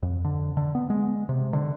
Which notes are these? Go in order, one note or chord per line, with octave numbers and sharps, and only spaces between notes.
F2
D3
D3
B3
G#3
C3
D3